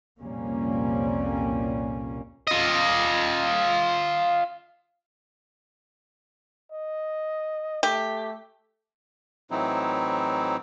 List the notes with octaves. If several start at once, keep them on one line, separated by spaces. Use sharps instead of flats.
C2 F2 A#2 G3 A#3 C#4
F4 D#5
D#5
A3 G4
A2 E3 F#3 C4 D#4 E4